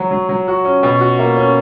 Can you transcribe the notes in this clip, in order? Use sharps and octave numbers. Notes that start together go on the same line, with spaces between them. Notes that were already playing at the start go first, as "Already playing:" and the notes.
Already playing: F#3 F#4
F#3
F#3
F#4
C#4
B2
F#4
A#3
C#4